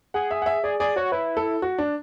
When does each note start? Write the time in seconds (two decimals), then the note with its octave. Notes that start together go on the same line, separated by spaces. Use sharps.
0.14 G#4 F#5
0.31 E5
0.42 F#5
0.46 E5
0.63 G#4 D5
0.79 G#4 D5
0.96 F#4 C#5
1.12 E4 B4
1.37 A4
1.62 F#4
1.78 D4